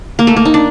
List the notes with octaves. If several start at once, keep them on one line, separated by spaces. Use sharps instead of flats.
A#3
A3
A#3
D#4
D4